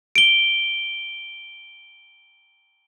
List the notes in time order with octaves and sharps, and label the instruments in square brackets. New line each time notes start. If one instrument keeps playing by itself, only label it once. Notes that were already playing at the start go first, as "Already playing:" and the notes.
[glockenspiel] D7 G7